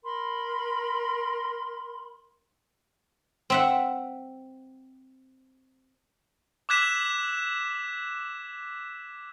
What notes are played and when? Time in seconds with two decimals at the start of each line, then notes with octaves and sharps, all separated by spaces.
0.04 A#4 B5 C6
3.50 C4 E5 F#5
6.69 D6 E6 F#6 G#6 B6 E7